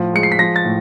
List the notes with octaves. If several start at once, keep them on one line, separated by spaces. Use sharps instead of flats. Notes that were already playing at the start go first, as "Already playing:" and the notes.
Already playing: A2 F3
G#3 C#7
C7
B6
F3 A#6
A6
A2